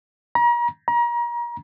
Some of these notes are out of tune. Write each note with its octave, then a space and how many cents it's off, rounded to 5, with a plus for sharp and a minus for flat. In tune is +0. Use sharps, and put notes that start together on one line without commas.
A#5 +40
A#5 +35